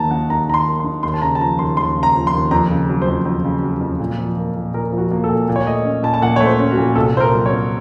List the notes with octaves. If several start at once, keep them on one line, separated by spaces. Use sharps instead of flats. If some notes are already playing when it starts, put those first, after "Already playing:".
Already playing: D#2 D#3 A#3 A5 A#5
D#4 F#5
D#2 A#5
D#3 A#5
C6
A#3
C6
D#4
D#2 C6
A5
C#3 A#5
A5
F3 A#5
D#2 C6
D#2 C6
C#3
A#5
F3
C6
D#2
F2 A#5
C#3
F#3
C5
F2
F2
C#3
F#3
F2
A#2
F3
A#3
A#2
A#2 A#4
F3
F#4
A#3
A4
A#2
A#2
C#5
A3 D#5
C#4
A#2 A5
A5
A#2 F#5
A3 C#5
C5
C#4
F#4
A#2
C2 A4
A#2 C5
A#4
F#3
C#5
C4